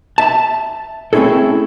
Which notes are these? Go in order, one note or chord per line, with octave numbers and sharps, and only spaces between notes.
E5 A5
A3 C4 C#4 E4 G#4 A4